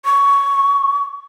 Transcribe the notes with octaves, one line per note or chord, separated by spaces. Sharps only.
C#6